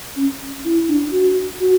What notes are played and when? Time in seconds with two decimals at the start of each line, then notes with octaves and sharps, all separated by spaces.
0.16 C#4
0.65 E4
0.88 D4
1.12 F#4
1.60 F#4